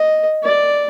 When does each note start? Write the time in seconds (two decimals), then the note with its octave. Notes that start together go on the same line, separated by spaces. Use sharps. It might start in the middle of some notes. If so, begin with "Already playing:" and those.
Already playing: D#5
0.44 D5